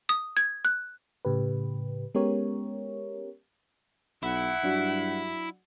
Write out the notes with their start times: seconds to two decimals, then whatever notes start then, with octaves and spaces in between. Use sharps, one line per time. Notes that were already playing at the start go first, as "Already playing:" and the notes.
0.09 D#6
0.37 G#6
0.65 F#6
1.25 A2 C#3 G4 B4
2.15 G#3 B3 C#4 G4 A#4 C#5
4.23 B1 E4 F#5
4.63 G2 F#3 D4 F#4